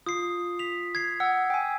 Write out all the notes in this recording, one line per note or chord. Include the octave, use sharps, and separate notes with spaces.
F4 D#6 C7
B6 F7
G#6 C7
F#5 E6
G5 G#5